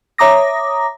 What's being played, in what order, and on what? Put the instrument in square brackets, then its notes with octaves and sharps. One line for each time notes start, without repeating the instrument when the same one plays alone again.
[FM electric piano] C#5 E5 A#5 D6 D#6 A#6